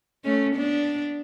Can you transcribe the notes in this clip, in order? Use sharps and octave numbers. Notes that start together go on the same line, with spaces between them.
A3 C#4
B3 D4